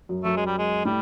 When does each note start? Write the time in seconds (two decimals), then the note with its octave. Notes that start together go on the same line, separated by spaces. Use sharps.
0.09 F#2
0.24 F#2 A3
0.36 G#3
0.46 G3
0.58 G#3
0.85 A2 G3